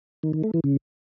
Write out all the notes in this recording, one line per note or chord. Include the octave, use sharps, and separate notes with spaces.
D#3
D#3
A3
E3
C#3